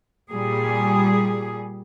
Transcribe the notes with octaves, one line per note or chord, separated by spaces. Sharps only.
A#2 G3 G#4